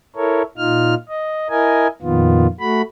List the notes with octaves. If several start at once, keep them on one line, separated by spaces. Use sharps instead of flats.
E4 A4 A#4 C#5
A#2 D#4 F4 F6
D#5
E4 A#4 D#5 G#5
F2 A#2 D#3 B3 F4
A3 F#4 B5